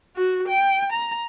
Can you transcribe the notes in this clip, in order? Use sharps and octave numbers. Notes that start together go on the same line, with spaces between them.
F#4
G5
A#5